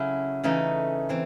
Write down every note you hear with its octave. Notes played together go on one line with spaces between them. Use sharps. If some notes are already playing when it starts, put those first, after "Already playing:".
Already playing: C#3 F#3 A3 C#4 E4
C#3 E3 A3 D#4
E3 C4